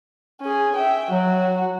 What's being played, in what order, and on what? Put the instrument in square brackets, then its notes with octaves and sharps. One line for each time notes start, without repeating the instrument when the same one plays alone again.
[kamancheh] C#4 G#4
E5 G5
[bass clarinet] F#3 [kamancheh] F#4